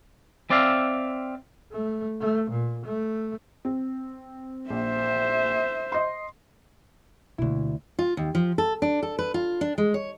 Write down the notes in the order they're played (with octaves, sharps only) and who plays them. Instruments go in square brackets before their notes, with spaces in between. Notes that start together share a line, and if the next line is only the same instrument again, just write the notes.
[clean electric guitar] C4 D5 E5 F5
[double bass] A3
A3
A#2
A3
[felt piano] C4
[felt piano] A#1 [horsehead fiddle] C5 E5
[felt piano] D#5 C6
[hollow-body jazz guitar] D2 E4 [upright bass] B2 A#3
[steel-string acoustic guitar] F4
D#2
F3
A4
D4
A4
B4
F4
D4
G#3
C#5